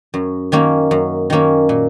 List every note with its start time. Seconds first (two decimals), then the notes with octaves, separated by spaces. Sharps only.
0.14 F#2
0.52 D#3 A#3 C#4
0.91 F#2
1.30 D#3 A#3 C#4
1.69 A#2